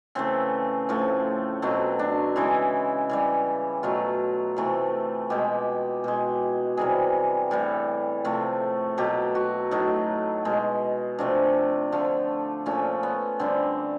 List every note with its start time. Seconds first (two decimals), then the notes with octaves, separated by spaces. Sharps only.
0.15 C#3 E3 A3 C4
0.89 A2 F3 A3
1.62 B2 F#3 A3 C4
1.99 D4
2.36 C#3 E3 G#3 E4
3.09 C#3 E3 G3
3.83 B2 F#3 A3 F4
4.57 C3 E3 A3
5.30 B2 G#3 G4
6.04 B2 G#3
6.77 C3 E3 G3 G#4
7.51 A2 E3 G3
8.25 C3 F3 A3
8.98 B2 F#3 A3 G4
9.35 F#4
9.71 A2 F#3 A3 D#4
10.45 B2 G#3
11.19 C3 F3 A3 D4
11.92 D3 F3 A3
12.66 A#2 F3 A3 C#4
13.03 B3
13.39 D3 G3 C4